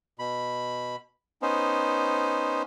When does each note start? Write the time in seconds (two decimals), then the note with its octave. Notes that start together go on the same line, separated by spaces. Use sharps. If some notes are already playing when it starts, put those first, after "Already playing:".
0.19 B2 B5
1.42 B3 C#4 D#4 C5